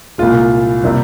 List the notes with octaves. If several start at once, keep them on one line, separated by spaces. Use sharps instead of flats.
C2 A#2 G#3 F4
C3 G3 A#3